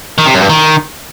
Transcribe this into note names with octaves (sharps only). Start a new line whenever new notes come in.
D#3
C3
F#2
G2
D#3